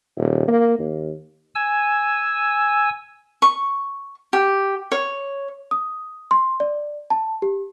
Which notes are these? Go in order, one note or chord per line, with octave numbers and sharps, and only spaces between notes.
D#1
A#3
D#2
G#5 E6
C#6
G4
C#5
D#6
C6
D5
A5
G4